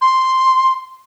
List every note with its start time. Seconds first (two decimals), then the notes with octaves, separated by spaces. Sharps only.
0.01 C6